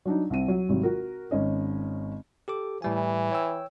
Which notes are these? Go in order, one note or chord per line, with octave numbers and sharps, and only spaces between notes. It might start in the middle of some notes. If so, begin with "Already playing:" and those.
F#3 D4 D#4
C2 C4 D#7
F#3
G#1 C3 F#3
F#4 A#4
G#1 C#4 D#5
G4 A4 D6
A2 E3 G3 G#5
C#5 G5 E6